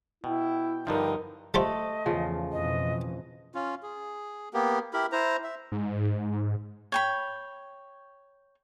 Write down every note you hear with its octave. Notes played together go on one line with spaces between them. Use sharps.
B2 E4 G5
G2 D3 F3 D#4 A#4
G3 A3 F4 C5 D#5
E2 C#3 F3
F2 B2 E3 D#5
C#4 F4
G#4
A#3 B3 G4
E4 G4 A#4 B5
E4 C5 A#5
E5
G#2
C#5 G5 B5